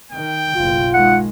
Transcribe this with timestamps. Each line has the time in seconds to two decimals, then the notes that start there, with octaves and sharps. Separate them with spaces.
0.12 D#3 G5
0.56 F#1 B1 F4
0.94 G#2 D#3 G#3 F#5